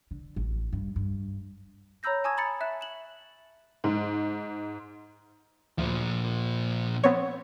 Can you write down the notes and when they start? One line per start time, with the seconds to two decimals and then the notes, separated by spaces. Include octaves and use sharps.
0.11 D3
0.36 A1
0.73 G2
0.96 G2
2.03 C#5 A#5 B5 E6 G6 A#6
2.24 G#5 A5 C#6 D#6 E6 G#6
2.37 A#5 B5 A6 C#7
2.61 E5 F#6 E7
2.81 E7 F#7
3.84 G#2
5.78 D2 A#2 F3
7.04 B3 C4 C#5